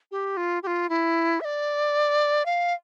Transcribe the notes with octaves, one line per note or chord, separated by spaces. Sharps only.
G4
F4
G4
F4
E4
E5
D5
F5